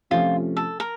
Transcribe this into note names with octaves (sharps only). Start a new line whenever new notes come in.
C3 F3 A3 C#4 F4
A4
A#4